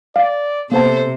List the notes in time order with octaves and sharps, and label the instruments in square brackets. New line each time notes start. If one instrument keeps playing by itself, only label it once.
[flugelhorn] D5 [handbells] F5 A6
[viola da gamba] C3 [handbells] A#3 B3 A5 [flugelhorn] A4 [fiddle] C5